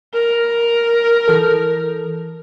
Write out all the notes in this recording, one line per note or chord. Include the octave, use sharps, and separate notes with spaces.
A#4
E3 A4